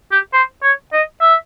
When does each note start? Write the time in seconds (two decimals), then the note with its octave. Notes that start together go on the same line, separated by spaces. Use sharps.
0.12 G4
0.33 C5
0.63 C#5
0.93 D#5
1.21 E5